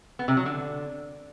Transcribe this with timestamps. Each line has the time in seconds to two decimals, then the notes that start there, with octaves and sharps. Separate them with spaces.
0.19 B3
0.28 C3
0.37 F#3
0.46 D3